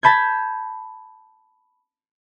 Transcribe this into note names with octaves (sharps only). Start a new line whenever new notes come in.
A5 B5 G6 G#6